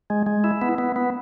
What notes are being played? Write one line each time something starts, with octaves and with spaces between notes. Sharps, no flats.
G#3
G#3
E4
B3
B3
B3